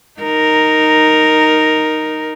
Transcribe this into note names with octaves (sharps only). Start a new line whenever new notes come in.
D#4 A#4